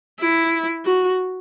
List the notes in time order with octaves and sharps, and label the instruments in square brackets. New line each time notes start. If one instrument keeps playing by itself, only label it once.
[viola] E4
F#4